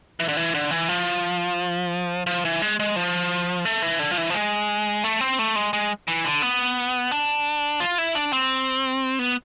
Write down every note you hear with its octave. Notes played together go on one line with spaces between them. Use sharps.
E3
D3
E3
D3
E3
F3
F3
E3
G#3
G#3
F3
A3
E3
D3
F3
E3
F3
G#3
A3
C4
A3
G#3
G#3
E3
D3
B3
D4
F4
E4
D4
C4
B3